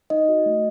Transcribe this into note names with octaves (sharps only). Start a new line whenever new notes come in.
D#4 D#5
F#4
A3